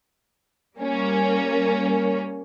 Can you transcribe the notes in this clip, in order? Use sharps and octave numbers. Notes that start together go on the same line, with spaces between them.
G3 A#3 C#4